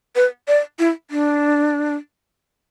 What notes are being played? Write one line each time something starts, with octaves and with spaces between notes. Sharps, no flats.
B4
D5
E4
D4